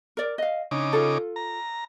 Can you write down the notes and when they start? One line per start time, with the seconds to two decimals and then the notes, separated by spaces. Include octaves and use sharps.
0.17 A#4 D5
0.38 D#5 F5
0.71 C#3 D4 D#4 D6
0.93 F4 A4
1.36 A#5